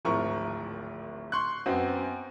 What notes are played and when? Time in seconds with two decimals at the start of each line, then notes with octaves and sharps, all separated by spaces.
0.05 D1 G#1 F3 E4 A#4 C#6
1.32 C6 C#6 F#6
1.66 F#2 B3 C4 F#4